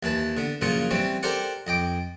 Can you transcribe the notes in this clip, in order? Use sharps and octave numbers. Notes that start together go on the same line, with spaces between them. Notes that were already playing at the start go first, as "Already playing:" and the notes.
D#2 E3 B4 A5
D3 B3
F#2 A#2 C#3 F3 F4 F#5
E3 G3 C4 C#4
G4 A4 A#4 C5 D5 F#5
F2 D#5 G5 D6